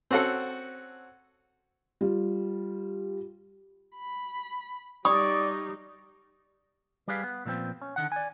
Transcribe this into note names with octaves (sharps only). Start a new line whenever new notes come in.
C4 C#4 F#4 A4 F#5
G3 F4
B5
G3 D#4 C#5 D5 D#6
G3 G4 G#4 B4 F5
B3
A#2 F3 B3 C4
C#4
D3 D#3 F#5
D5 G#5